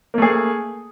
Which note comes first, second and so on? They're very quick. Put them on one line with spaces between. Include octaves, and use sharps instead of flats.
A#3 A3 G#4